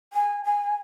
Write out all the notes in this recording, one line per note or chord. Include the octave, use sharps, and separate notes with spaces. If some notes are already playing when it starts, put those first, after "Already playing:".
G#5
G#5